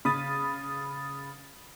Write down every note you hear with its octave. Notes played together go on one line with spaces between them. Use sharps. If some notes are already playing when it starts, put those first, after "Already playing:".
C#3 B5 D#6 A6